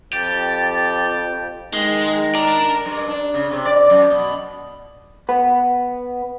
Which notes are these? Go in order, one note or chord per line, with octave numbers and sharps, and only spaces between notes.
F2 G4 A6
D#3 G#3 A#6
D4 A#4 D5 A#5
G2
D4
C#3
C3
D5
F#2
B2
B3 B4